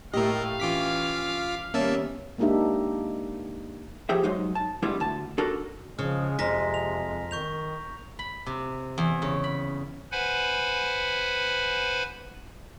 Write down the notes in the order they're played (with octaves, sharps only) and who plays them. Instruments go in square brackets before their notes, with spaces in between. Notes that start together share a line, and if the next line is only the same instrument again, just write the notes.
[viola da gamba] A2 A3 [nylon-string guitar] G4 [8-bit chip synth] A#4 D#5 [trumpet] F5
[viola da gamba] E3 C#4 [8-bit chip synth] F4 D6 B6
[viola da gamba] D#3 G3 B3 [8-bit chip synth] A#3 E5 A5 [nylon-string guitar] C#4
[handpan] G#3 A#3 D4 D#4 G4 E5
[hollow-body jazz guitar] F3 G4 G#4 E5
F#3 G#3 D#4 C5
A5
G3 G#3 B3 D4 E4
D2 A5
D4 F#4 A4 A#4
[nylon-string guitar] C#3 [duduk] F3 [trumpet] G#3 [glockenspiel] F6
[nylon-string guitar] F2 [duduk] C3 [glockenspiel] A#5 A#6 B6
[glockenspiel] F7
[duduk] D#3 [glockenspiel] C#6 G6 F7
[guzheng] B5
C3
E2
C#3
B5
[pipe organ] B4 C5 F#5 G#5 B5